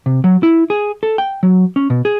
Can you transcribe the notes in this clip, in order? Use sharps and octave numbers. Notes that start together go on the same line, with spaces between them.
C3
F#3
E4
G#4
A4
G5
F#3
C#4
B2
G#4